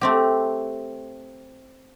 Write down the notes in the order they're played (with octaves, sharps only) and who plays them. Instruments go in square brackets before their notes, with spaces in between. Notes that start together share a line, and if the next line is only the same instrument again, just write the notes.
[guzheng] A3 C4 G4